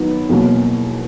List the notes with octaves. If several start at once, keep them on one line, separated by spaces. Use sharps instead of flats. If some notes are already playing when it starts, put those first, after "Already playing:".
Already playing: D#3 F#3 B3 D#4
E2 B2 F#3 A#3